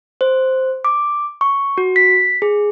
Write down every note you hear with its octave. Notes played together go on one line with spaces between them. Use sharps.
C5
D6
C#6
F#4
B6
G#4